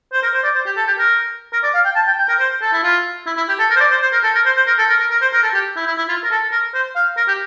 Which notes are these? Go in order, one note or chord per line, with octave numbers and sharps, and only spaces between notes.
C5
A#4
C5
D5
C5
G4
A4
G4
A#4
A#4
D5
F5
G5
A5
G5
G5
A#4
C5
A4
E4
F4
E4
E4
G4
A4
A#4
C5
D5
C5
C5
A#4
A4
A#4
C5
C5
A#4
A4
A#4
A#4
A#4
C5
A#4
A4
G4
E4
E4
E4
F4
A#4
A4
A#4
C5
F5
A#4
G4